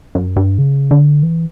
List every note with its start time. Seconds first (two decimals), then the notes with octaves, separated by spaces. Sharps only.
0.15 F#2
0.36 G2
0.58 C#3
0.91 D3
1.23 E3